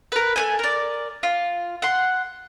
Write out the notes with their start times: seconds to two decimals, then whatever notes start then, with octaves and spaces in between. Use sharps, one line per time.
0.12 A#4 B4
0.36 A3 C4 G#5
0.59 A#4 D5
1.23 F4
1.82 F#5 C6